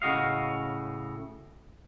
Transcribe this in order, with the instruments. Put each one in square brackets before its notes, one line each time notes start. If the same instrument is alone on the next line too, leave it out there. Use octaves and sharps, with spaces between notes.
[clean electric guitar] A2 C#3 F#4 D#5 F5